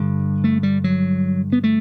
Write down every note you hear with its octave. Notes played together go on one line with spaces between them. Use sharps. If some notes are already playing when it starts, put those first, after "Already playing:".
Already playing: G2 D3 G3
A3
G3
F#3
B3
A3